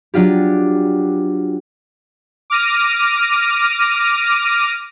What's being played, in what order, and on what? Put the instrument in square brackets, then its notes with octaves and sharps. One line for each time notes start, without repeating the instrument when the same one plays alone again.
[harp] F#3 D4 F4 G4
[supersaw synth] D6 F6 A#6 D#7